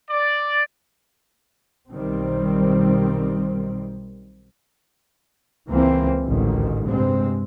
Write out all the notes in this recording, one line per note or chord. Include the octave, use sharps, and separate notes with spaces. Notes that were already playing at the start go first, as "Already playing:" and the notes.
D5
B1 D#3 G3 C4
C#2 E3 A#3 C4
A1 D2 G#2 D#3
G2 C3 G#3 C4